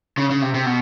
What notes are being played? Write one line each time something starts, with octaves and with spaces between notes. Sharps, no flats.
C#3
C#3
C3
C3
B2